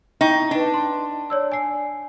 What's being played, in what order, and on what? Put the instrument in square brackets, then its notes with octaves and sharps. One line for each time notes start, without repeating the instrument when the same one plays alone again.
[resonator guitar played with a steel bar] D#4 [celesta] E4 G5 C#6
[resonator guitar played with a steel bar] D4 [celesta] D#4 B4
[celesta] C6
C#5 D5 E6
G#5 C7